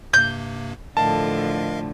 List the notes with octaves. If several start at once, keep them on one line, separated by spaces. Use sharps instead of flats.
G2 C3 A#3 G6
A2 D3 F3 A#4 D#5 F5 A5